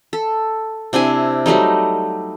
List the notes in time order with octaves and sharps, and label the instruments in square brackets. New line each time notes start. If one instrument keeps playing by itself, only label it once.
[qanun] A4
C3 D4 E4 G#5
F#3 G3 A3 D#4